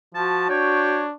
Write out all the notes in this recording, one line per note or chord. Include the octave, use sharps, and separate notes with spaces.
F3 F#4 A5
D4 C#5 G5